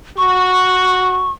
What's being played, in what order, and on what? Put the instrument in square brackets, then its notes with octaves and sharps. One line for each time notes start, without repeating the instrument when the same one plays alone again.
[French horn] F#4 [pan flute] C#6